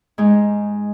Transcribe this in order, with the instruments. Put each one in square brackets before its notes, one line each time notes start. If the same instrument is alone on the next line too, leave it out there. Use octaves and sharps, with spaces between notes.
[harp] G#2 G#3